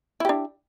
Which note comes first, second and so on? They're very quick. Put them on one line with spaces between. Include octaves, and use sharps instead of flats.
E4 G4 D4